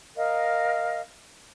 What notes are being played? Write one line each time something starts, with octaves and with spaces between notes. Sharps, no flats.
A#4 D#5 F5